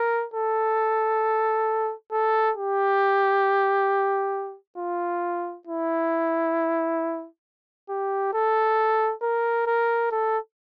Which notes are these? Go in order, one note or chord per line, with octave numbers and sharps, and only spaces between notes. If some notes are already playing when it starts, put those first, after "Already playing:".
Already playing: A#4
A4
A4
G4
F4
E4
G4
A4
A#4
A#4
A4